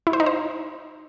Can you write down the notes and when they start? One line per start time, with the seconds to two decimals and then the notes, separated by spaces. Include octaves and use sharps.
0.07 E4
0.13 C5
0.20 D#4
0.26 C5